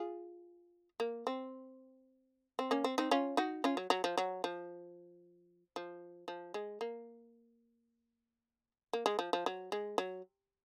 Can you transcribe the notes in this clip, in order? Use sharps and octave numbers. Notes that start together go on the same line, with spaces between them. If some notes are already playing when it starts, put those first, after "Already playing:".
Already playing: F4 G#4
A#3
C4
C4
A#3 C#4
C4
C4 D#4
C#4 F4
D#4 F#4
C#4 F4
F#3
F#3
F3
F#3
F3
F3
F3
G#3
A#3
A#3
G#3
F3
F3
F#3
G#3
F#3